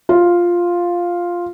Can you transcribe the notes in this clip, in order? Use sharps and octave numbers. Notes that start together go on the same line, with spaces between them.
F4